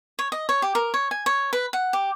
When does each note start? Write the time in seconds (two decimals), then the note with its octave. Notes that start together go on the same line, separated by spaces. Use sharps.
0.19 C#5
0.32 D#5
0.49 C#5
0.62 G4
0.75 A#4
0.94 C#5
1.11 G#5
1.26 C#5
1.53 B4
1.73 F#5
1.93 G4